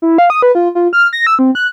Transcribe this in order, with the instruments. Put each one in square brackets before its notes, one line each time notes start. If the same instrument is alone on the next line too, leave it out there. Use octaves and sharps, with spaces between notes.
[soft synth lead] E4
F5
D#6
B4
F4
F4
F6
A#6
E6
C4
F#6